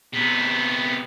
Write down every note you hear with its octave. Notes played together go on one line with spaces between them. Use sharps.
C3 B3